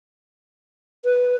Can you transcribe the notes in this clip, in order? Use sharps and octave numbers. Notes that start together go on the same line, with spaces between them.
B4